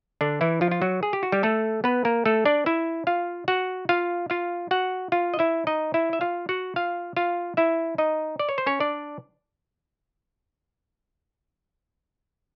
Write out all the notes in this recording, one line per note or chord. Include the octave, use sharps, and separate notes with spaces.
D3 D4
E3 E4
F3 F4
F4
F#3 F#4
G#4
G4
F#4
G3 G4
A3 A4
B3 B4
A#3 A#4
A3 A4
D4 D5
E4 E5
F4 F5
F#4 F#5
F4 F5
F4 F5
F#4 F#5
F4 F5
D#5
E4 E5
D#4 D#5
E4 E5
E5
F4 F5
F#4 F#5
F4 F5
F4 F5
E4 E5
D#4 D#5
D5
C#5
C5
C#4 C#5
D4 D5